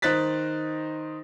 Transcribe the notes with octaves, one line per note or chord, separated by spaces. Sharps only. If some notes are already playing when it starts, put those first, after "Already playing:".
D#3 D#4 C5 F#6 A6 B6